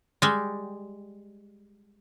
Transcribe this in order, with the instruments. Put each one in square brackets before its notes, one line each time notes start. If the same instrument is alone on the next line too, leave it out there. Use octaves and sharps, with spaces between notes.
[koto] G3 G#3